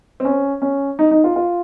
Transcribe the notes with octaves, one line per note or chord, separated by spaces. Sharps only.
C4
C#4
C#4
D#4
D#4
F4
F4